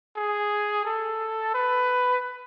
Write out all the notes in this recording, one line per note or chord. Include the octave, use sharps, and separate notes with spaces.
G#4
A4
B4